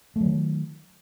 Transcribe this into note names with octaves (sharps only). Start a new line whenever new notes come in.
D#3 F#3 A3